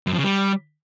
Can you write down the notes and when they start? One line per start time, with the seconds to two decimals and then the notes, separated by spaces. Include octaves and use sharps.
0.07 F#2
0.12 F3
0.18 C#3
0.24 G3